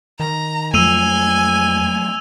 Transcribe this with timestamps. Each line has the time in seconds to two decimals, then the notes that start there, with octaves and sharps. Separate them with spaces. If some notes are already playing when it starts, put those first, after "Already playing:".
0.20 D#3 A#5
0.74 F2 F3 F#3 A3 G#5 E6 D#7 F7